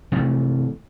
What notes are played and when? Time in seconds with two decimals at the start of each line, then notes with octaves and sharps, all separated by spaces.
0.12 C3 E3 A3